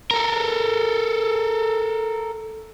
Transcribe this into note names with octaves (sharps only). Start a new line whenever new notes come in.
A4 A#4